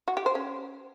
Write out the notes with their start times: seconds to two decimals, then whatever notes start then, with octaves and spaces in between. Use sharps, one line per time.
0.08 F#4
0.17 G4
0.26 C5
0.35 C#4